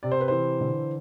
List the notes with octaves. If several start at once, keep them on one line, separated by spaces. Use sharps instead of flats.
C3 D5
C5
B4
E3 C5
D3